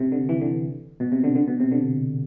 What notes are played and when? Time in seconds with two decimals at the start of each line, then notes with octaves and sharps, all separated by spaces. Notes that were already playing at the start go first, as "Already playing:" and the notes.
Already playing: C3
0.12 D3
0.29 E3
0.41 D3
1.00 B2
1.12 C3
1.24 D3
1.35 D3
1.48 B2
1.60 C3
1.72 D3